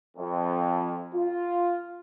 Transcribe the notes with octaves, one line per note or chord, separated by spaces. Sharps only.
F2
F4